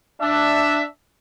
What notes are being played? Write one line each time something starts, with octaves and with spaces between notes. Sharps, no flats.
D4 E5